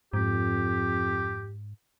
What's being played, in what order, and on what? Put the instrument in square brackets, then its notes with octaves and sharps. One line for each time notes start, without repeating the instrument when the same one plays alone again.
[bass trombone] F2 [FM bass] G#2 [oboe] G4